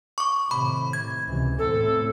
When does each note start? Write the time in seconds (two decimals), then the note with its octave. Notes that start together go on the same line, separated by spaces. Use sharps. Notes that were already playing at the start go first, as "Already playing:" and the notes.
0.18 C#6 D6
0.51 A2 C3 D#3 B5
0.93 G#6
1.27 C#2 C3 E3
1.59 E2 A2 C4 A4